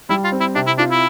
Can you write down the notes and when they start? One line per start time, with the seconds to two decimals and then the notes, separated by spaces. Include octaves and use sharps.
0.09 G3 E4
0.24 F4
0.32 C4
0.40 E4
0.55 C3 D4
0.67 E4
0.78 D4 F4
0.91 E4